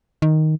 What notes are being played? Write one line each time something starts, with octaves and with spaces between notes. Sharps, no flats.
D#3